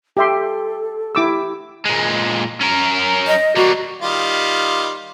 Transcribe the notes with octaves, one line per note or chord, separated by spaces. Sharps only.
G4 A4 E5 C6
E4 G4 D6 E6
A#2 G#3
C#4 A#4
D#5
G3 A#3 F#4
D#3 G3 F4